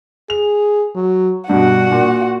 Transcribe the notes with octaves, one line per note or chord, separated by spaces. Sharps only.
G#4 F7
F#3
G2 B2 D4 F#4 F#5
A#2